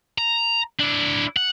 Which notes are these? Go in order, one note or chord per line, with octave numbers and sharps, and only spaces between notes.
A#5
D4 E4
F#5